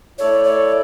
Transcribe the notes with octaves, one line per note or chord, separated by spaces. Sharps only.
A3 E4 A4 C#5 D5
C#5